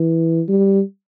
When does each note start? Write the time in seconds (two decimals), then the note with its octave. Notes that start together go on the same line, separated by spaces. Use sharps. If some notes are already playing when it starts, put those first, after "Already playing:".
Already playing: E3
0.49 G3